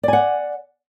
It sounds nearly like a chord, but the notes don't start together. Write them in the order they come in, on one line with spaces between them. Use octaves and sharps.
D5 G#5 F#5